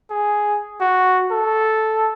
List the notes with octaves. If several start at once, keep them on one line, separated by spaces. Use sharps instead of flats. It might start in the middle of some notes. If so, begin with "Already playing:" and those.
G#4
F#4
A4